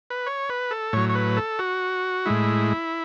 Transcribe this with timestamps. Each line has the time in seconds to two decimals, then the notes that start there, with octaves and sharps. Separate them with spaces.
0.10 B4
0.26 C#5
0.49 B4
0.71 A4
0.93 A2 F#3 C#5
1.09 C#5
1.15 B4
1.37 A4
1.59 F#4
2.26 A2 G#3 E4